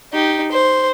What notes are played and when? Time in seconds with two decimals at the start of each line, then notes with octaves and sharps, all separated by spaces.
0.13 D#4 G4
0.51 C5